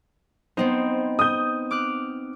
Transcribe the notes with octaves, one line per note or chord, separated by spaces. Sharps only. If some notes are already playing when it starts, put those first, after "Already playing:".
B3 C4 D#4 C5
D#6 G6
D6 F6 F#6